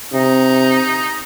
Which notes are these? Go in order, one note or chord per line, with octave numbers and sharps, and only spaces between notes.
C3 D#4